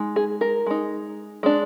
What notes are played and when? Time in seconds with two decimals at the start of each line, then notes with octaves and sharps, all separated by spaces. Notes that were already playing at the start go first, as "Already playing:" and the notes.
Already playing: G#3 D#4
0.16 G#4
0.41 A#4
0.66 G#3 D#4
1.43 G#3 D4